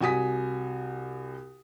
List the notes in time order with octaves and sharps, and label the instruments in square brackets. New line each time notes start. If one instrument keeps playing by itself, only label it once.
[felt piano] C2 F#4 G#5 D#6 B6